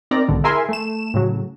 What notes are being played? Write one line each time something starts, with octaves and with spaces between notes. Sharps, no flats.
C4 D#4 A#4 D5 A#5
B1 G#2 D3 D#3
E4 G#4 A#4 E5 G#5 C6
A3 E7
A2 C#3 F#3